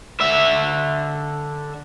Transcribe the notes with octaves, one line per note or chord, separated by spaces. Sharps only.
D3 E5